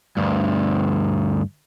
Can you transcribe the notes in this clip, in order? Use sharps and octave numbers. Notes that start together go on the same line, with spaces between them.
D2 G2